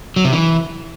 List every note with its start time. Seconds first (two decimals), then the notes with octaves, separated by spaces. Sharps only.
0.16 F#3
0.25 C3
0.33 E3